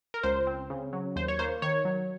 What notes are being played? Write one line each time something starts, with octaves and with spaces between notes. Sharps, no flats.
A#4
C#2 C5
C4
C#3
F#3
D#2 C5
C#5
A#3 C5
D#3 C#5
F#3